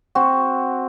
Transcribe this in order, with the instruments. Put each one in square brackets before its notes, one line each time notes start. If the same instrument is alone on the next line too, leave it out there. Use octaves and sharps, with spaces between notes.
[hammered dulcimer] C4 F#4